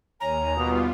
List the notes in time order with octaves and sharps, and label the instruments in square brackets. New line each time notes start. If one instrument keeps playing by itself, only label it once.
[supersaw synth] D#2 [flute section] A#4 C#5 G#5 [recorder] A#5
[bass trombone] B2 [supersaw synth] G3 B3 F4 [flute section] D6 D#6